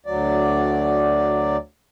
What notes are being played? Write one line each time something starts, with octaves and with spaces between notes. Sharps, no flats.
D2 F#3 D5